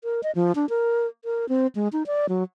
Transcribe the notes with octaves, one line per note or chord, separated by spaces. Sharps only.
A#4
D#5
F3
D4
A#4
A#4
C4
G#3
D#4
D5
F#3